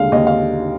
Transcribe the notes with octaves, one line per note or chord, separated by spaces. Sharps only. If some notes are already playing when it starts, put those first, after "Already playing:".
Already playing: D#2 D3 G#3 F5
D#2 D#5
F5